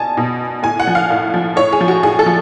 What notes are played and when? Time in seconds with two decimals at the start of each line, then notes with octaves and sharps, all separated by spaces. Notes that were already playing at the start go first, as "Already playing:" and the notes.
Already playing: B2 G#5 A5
0.17 B2
0.63 A2 G#5
0.80 F#5
0.87 F3
0.95 F5
1.10 A2
1.34 F3
1.56 A2 C#5
1.72 G#4
1.81 F3
1.88 F#4
2.03 A2 G#4
2.19 A4
2.26 F3